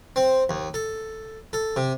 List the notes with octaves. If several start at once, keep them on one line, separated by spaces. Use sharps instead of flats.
C4
D#2
A4
A4
C3